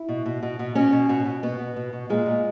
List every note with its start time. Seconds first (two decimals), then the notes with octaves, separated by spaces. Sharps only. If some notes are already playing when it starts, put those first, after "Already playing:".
Already playing: E4
0.09 B2
0.26 B2
0.43 B2
0.59 B2
0.75 B2 C#4
0.92 B2
1.09 B2
1.26 B2
1.43 B2 B3
1.59 B2
1.76 B2
1.93 B2
2.10 A#2 G#3
2.26 A#2